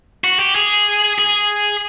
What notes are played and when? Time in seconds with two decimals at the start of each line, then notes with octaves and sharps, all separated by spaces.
0.24 F#4
0.39 G4
0.55 G#4
1.19 G#4